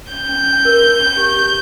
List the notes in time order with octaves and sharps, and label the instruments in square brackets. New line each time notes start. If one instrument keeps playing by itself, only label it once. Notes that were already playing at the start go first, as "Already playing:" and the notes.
[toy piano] C#4 [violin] G6
[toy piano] C#4
C#4
A#4
A#4
C#4
G4
G4